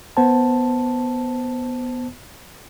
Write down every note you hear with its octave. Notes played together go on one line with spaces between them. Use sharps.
B3 C5 A5